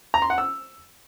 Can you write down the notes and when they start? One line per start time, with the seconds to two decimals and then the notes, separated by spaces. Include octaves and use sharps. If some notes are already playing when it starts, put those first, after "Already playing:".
0.14 A#5
0.22 C6
0.30 F#5
0.38 E6